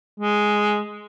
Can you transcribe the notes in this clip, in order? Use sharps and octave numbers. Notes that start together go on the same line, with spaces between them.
G#3